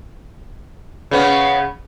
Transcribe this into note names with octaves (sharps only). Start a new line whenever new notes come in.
C#3 B3 C#4